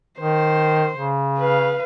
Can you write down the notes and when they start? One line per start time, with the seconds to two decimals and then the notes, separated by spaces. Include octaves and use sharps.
0.20 D#3 C5
0.96 C#3
1.39 B4 F5